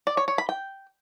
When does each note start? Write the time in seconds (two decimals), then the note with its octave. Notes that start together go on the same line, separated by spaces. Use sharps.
0.07 D5
0.17 C#5
0.28 C#5
0.38 B5
0.49 G5